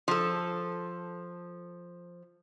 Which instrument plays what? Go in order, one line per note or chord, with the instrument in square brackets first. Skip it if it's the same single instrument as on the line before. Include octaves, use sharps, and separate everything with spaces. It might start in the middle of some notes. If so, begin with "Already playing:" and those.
[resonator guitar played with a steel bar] F3 A4